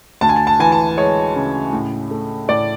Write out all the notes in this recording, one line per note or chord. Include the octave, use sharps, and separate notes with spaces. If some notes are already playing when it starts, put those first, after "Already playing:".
D2 A5
G#5
A5
A5
E3 G#5
A5
G#3 C#5
C#3
A2
A3
A2 D5